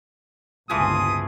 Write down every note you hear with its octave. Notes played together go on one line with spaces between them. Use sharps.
G1 C#2 A#2 E3 F3 G#4 D#6